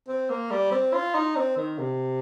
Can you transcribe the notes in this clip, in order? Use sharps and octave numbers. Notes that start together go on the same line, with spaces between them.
C4
A#3
G3
C4
F4
D#4
C4
D#3
C3